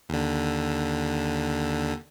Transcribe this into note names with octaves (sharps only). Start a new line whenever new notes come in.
D#2 D3